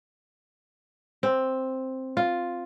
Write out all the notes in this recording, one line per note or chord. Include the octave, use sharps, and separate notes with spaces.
C4
F4